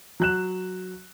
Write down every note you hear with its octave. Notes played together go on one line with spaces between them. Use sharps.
F#3 F#6 E7